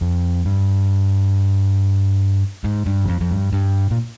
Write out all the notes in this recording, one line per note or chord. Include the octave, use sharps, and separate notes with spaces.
F2
G2
G#2
G2
E2
F2
F2
G2
G2
A#2